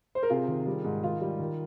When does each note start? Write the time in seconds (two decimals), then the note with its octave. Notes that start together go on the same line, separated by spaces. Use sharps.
0.15 C5
0.23 A#4
0.30 C3 F4 G#4
0.48 D#3
0.66 G3
0.84 G#2
1.02 D#3 F4
1.21 G3
1.40 D#3